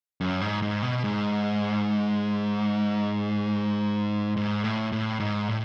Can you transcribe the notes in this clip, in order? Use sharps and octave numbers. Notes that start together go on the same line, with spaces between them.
F#2
G#2
G#2
B2
G#2
G#2
A2
A2
G#2
A2